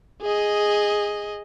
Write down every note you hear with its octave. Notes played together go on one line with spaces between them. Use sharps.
G#4 D#5